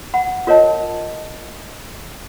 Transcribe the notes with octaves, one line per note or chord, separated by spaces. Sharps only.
F#5 B5
F4 A#4 C#5 D#5 A5